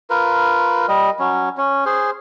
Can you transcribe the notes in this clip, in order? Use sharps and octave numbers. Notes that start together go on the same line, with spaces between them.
F4 A#4 B4
G3 D#5
F#3 C#4
C#4
G#4 C5